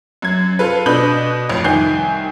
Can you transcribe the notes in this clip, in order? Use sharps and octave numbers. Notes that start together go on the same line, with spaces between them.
F#2 G#6
F4 A4 B4
B2 D4 B4 B5 G6 F#7
A1 F2
C2 D#3 G#5 G6 C7